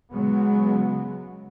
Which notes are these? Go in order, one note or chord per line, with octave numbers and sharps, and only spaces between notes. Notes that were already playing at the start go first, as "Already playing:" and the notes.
C#3 F#3 G#3 B3